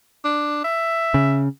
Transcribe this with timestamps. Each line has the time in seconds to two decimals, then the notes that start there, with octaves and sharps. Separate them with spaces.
0.24 D4
0.64 E5
1.14 C#3